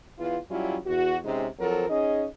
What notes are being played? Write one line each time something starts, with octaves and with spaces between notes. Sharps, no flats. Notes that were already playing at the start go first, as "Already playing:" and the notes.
E2 E3 F4
F#3 G3 C#4 E4 F4
E2 F#4
C3 G#3 C4 C#4 D#4
F3 F#3 C4 A4 A#4
C#4 D#4 G#4 D#5